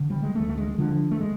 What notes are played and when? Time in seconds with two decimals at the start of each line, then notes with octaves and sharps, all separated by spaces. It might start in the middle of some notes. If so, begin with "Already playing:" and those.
Already playing: D3
0.10 G3
0.23 G#3
0.35 D2 A3
0.49 A3
0.58 G#3
0.78 D3 F3
1.11 A3
1.21 G#3